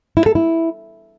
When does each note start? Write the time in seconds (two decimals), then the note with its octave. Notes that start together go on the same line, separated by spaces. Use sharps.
0.17 E4
0.26 A4
0.35 E4